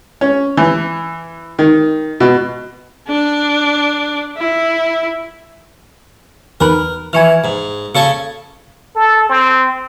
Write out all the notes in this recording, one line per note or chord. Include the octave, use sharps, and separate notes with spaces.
C#4
E3
D#3
B2
D4
E4
E2 D#3 A#4 B4
E3 G#5 C#6 F6
G#2
C#3 A4 G#5 C#6 A6 C#7
A4
C4